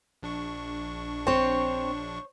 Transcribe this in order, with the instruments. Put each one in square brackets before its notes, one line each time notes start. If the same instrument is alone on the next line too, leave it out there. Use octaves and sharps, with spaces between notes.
[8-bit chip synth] A#1 D4 C#6
[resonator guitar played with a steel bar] C4 [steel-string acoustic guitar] C5 C#5